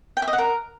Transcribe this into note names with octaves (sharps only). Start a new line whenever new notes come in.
G5
E5
D#5
F#5
A#4